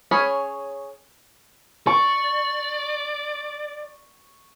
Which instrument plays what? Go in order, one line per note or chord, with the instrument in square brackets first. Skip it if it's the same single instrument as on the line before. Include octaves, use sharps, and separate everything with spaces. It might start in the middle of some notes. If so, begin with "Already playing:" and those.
[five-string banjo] C#4 G#4 C#5 B5
[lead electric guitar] D5 [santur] C#6